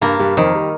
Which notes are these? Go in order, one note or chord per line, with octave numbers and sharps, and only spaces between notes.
G2 G3 A#3
G2 G3
F2 D#3 F3
G3